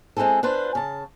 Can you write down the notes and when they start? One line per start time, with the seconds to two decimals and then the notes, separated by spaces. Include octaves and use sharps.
0.17 G#3 C4 E4 G#4 A4
0.43 D4 F4 B4 C5
0.75 C#3 A5